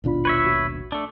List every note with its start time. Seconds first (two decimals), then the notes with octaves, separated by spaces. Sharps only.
0.04 D#1 A1 B2 D4 F4 B5
0.25 B4 C#5 E5
0.45 A#1 F#4
0.92 A3 D4